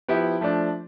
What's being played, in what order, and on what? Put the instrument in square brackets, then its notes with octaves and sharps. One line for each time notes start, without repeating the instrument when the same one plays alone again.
[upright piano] F3 B3 E4 G4
F3 A3 D4